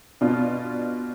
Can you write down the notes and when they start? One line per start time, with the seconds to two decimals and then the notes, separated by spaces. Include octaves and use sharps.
0.21 B2 D4 F4